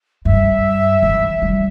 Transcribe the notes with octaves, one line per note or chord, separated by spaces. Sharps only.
G2 E5
E3
G3